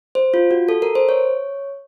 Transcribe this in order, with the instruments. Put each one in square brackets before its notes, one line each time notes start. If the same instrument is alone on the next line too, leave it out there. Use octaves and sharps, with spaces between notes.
[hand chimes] C5
F4
F#4
A4
A#4
C5
C#5